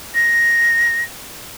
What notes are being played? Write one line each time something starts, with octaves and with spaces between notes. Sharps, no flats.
A#6